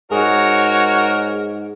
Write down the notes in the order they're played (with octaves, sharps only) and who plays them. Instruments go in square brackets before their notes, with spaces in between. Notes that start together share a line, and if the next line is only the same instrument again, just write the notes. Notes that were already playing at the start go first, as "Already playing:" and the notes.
[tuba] G#2 [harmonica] F#4 A#4 C#5 [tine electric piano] G#4